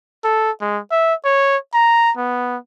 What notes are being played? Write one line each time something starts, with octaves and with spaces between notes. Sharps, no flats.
A4
G#3
E5
C#5
A#5
B3